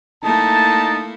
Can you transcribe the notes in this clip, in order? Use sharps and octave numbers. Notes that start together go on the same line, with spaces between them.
A3 A#3 D#4 E4 A5